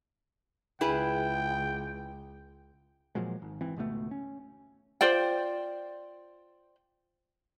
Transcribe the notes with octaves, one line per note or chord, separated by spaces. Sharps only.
C#2 E4 G#4 B4 G5
A#2 F3 F#3 G#3
G#1
G#1 E3 C4
G#1 C#2 B2 A3
C#4
F4 C5 D5 G5